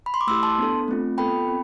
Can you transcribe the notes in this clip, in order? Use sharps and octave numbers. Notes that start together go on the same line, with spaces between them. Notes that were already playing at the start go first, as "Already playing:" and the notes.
B5
C6
D6
A3 E4 G4 C6 E6
A5 C6
B3 D4 A4
A3 C4 F4
B3 F4 A4 G5 B5
C4